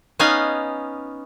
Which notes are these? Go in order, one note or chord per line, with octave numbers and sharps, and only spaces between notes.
B3 C#4 D#4 F5 G#5